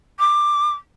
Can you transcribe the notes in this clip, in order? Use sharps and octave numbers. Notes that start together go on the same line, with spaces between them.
D6